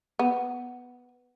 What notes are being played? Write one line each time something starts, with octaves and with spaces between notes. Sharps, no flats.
B3